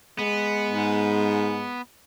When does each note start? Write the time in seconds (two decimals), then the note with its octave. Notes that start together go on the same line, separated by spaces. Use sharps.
0.19 G#3 B3
0.70 G#2